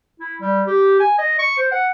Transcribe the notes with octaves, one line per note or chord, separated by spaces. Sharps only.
E4
G3
G4
G#5
D#5
C#6
C5
F#5